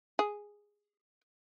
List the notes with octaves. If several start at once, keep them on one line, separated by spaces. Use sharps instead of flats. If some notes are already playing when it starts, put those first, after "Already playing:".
G#4